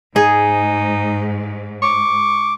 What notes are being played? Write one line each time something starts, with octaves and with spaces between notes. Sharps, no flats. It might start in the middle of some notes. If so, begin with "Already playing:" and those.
G#2 D#4 G#4
C#6 D6